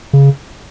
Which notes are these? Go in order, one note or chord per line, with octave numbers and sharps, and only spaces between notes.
C#3